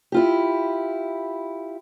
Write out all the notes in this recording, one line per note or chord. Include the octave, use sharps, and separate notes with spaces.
E4 F4 G4